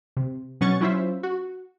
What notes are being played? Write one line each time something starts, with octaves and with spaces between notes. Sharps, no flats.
C3
B2 F#3 C#4 F#5 C#6 A6
F#3 C#4 E4 F4 C5 E5
F#4